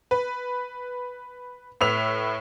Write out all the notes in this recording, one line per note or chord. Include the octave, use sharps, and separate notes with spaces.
B4
A2 B4 E6 B6 F7